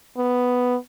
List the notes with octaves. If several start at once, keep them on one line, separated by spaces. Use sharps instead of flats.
B3